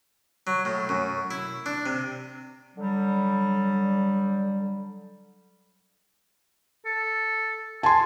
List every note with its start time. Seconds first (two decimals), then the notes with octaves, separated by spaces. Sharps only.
0.47 F#3
0.65 A2
0.89 F#2
1.31 E4
1.66 D4
1.86 C3
2.76 D3 F#3 G3
6.86 A4
7.83 G#5 A5 C6